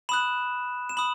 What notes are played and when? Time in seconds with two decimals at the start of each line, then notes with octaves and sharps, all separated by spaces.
0.09 B5 D#6 F#6 E7
0.89 E7
0.97 B5 D#6 F#7